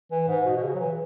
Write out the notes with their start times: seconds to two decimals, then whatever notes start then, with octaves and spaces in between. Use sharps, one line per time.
0.11 E3
0.28 G#2
0.46 B2
0.57 B2
0.63 C#3
0.75 F#3
0.80 E3